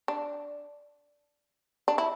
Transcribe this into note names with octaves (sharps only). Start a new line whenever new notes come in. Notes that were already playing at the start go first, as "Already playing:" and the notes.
D4
D4
E4